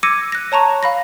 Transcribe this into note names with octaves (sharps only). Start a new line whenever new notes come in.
D6 E6 G#6 A#6 C#7 D#7
F#6 A#6
C#5 A5 A#5 C#6
F5 B5 A#6